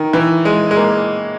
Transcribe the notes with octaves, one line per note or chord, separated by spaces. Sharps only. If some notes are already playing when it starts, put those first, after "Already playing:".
Already playing: D#3
E3
G#3
G#3
A#3